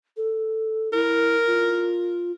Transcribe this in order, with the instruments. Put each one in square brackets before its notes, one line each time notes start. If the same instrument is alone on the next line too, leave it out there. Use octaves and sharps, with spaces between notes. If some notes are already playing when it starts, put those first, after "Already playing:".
[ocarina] A4
[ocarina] E4 [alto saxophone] A#4
[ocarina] F4